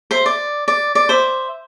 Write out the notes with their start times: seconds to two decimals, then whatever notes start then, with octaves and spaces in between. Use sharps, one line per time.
0.11 C5 E5
0.26 D5
0.68 D5
0.95 D5
1.09 C5 E5